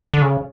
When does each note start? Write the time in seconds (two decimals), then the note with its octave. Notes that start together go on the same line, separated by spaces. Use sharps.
0.14 D3
0.22 C#3